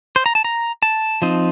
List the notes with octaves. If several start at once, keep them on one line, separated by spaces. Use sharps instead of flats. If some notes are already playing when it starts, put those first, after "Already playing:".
C5
A#5
A5
A#5
A5
F3 C4 D#4